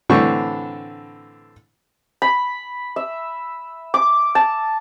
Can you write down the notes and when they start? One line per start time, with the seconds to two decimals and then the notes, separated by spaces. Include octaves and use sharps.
0.09 A2 D3 E3 C4 D4 C#6
2.22 B5
2.96 E5
3.94 D6
4.35 A5